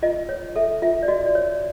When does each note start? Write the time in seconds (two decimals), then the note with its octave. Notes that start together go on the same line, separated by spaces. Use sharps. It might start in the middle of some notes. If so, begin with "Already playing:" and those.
0.02 F4 D#5
0.29 C#5
0.56 A4 E5
0.82 F4 E5
1.03 D5
1.08 F#4 D#5
1.26 D5
1.35 C#5